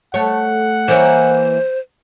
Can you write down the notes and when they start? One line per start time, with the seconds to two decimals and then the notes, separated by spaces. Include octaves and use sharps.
0.14 A3 C#5 F#5
0.88 E3 A#3 C5 C#5